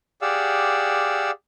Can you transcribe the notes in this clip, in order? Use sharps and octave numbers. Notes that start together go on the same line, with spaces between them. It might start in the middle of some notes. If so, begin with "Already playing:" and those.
G4 G#4 D5 F5 F#5 E6